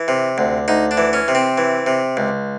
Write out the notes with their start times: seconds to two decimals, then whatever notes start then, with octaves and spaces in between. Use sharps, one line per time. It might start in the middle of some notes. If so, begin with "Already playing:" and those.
Already playing: E3
0.08 C3
0.38 D2
0.68 D2 D#4
0.91 D4
0.97 E3
1.13 C#4
1.28 C3
1.35 C4
1.58 E3
1.86 C3
2.17 C#2